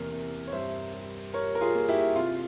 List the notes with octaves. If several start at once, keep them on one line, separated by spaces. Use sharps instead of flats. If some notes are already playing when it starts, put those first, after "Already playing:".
Already playing: E2 C3 A#3 A#4
C3
C#5
G2 C5 E5
G3
G3 A#4 C#5
A#4
F4 G#4
A#3
E4 G4
C3 F4